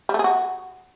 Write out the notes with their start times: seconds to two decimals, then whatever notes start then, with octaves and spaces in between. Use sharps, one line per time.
0.09 G3
0.14 A3
0.19 G#4
0.24 F#4